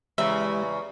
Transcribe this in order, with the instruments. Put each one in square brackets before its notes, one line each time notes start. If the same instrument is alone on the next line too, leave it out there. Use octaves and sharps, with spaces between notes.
[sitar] E2 C#3 [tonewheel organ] G#3 G4 [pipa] E5